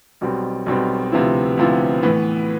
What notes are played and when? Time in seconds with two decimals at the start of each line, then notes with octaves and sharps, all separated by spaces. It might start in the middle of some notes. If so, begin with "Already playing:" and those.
0.21 B1 B2 G3 C4
0.66 B1 B2 G3 C4
1.12 D2 C3 F3 B3 E4
1.57 D2 C3 F3 B3 E4
2.03 A2 E3 B3